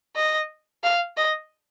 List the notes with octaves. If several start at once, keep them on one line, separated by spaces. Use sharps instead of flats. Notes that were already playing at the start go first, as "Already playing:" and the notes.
D#5
F5
D#5